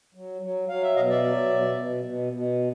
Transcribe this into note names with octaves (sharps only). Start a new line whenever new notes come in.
F#3
F#3
F#3 F5
E5
B2 D#5 F5
D5 E5
F#3
B2
B2
B2
B2